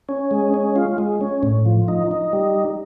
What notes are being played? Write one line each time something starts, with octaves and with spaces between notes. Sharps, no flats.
C#4
G#3
C#4
F4
G#3
C#4
A2
F3
D#4
D#4
G3